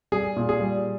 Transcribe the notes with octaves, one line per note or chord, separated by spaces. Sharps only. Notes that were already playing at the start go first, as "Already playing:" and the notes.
G3 G#4
A#2
G#4
G3